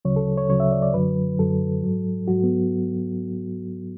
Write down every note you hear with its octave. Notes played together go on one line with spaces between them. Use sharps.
D2 C#3 F#3 C#5
A4
C#5
D2 C#3 F#3 C#5
E5
D5
D5
F#2 D3 F#3 B4
F#2 D3 F#3 A4
G#2 F#3
G#2 F#3 F#4
B3